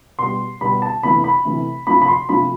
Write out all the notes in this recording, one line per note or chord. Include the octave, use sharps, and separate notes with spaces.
B2 G3 C6
B2 G3 B5
A5
C3 E3 A3 B5
B5
C3 E3 A3
C3 F3 A3 B5
B5
C6
C3 F3 A3 B5